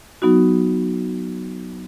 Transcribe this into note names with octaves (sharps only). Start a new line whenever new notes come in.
F#3 B3 D#4 F#4